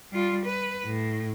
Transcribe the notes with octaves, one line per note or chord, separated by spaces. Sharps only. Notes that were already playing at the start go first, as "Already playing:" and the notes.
G3 F4
B4
A2